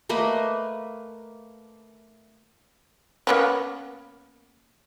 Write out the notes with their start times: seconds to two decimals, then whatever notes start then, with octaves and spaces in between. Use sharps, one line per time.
0.09 A3 A#3 B4 D#5
3.27 A#3 B3 C#4